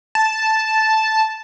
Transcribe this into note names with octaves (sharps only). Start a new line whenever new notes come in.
A5